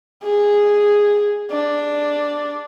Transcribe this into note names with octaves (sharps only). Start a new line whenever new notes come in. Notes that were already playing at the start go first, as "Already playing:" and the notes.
G#4
D4